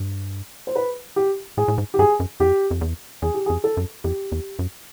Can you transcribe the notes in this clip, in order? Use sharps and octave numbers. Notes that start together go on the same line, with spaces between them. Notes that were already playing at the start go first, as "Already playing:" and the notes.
Already playing: G2
C5
B4
G4
A2 G#4
A2
G#2
G4
G2 G#4
F#2
F2 G4
F2
E2
E2 G#4
G4
G#4
F2
A4
F#2
F2 G4
E2
F#2